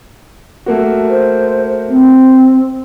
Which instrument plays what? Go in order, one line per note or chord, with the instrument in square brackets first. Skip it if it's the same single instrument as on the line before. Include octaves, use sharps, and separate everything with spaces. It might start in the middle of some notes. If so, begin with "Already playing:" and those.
[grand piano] A3 A#3 F#4
[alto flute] C5
C4